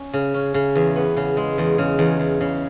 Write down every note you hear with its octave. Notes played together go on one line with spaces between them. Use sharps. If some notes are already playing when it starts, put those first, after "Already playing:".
Already playing: C#4
C#3
C#4
C#3
E2
B3
C#3
G#3
E2
C#3
E2
E2
C#3